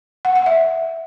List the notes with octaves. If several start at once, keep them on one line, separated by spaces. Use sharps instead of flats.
F#5
F#5
E5